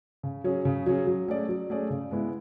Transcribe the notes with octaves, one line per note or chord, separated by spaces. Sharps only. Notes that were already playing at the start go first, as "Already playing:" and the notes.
C#3
F#3 C#4 G#4
C#3
F#3 C#4 G#4
F#3
A3 C#4 G#4 D5
F#3
A3 C#4 G#4 D5
C#3
G#3 B3 E4